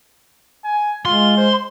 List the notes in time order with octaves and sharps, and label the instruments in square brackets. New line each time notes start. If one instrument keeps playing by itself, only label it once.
[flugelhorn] G#5
[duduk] G#3 [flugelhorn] F4 [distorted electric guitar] C6
[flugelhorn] C5